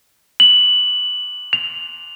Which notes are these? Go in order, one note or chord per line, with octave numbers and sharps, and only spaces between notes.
F#7
F7